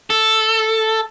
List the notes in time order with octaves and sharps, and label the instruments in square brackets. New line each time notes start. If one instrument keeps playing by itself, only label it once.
[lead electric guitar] A4